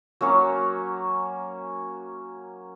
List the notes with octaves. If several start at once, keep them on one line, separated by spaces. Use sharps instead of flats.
F#3 A#3 C#4 C#6